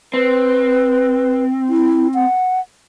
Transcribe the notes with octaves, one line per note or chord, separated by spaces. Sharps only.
C4 B4
E4
F#5